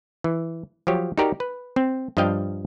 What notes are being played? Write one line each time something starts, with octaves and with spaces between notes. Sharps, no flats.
E3
F3 F#3 G4 C#5
D#4 F#4 G4 A#4 D5
B4
C4
G2 F3 D4 D#5 F5 G5